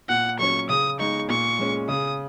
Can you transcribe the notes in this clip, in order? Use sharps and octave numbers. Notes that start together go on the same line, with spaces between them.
A#2 F#5
F#3 C#4 C#6
C#3 D#6
G#3 D#4 C#6
A#2 C#6
G#3 C#4
C#3 D#6